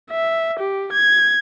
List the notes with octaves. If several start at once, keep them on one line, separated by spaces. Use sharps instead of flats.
E5
G4
G#6